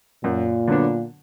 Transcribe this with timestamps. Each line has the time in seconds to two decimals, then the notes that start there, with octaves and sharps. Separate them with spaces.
0.23 F#2 A#2
0.68 D3 F#3 B3 D4